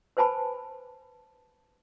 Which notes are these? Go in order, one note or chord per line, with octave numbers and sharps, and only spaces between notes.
B4 C5 G#5 A5 B5